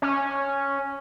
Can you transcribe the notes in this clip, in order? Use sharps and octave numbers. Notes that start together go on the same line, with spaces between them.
C#4